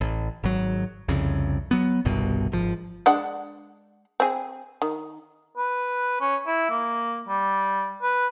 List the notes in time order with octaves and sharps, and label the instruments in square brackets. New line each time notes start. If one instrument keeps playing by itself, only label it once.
[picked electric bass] A1
G#1 F#3
C2 F2 C#3
F#3 B3
G1 C2 G2 B2
G#1 F3
[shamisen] G#3 D4 F#5
C4 G#4
D#3
[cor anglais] B4
C#4
E4
A#3
G3
B4